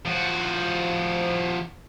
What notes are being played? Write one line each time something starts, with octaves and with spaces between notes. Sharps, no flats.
F3 F#4